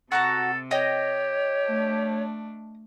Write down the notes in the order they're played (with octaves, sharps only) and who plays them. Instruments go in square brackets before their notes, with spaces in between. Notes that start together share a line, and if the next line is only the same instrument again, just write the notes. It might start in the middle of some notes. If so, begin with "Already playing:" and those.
[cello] C3 [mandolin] F#4 A5 A#5 [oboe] A4
[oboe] G4 [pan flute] C#5 [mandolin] D#5 G5
[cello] A3 D4